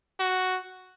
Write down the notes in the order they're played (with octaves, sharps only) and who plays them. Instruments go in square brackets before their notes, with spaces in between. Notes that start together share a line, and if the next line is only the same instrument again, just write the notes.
[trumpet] F#4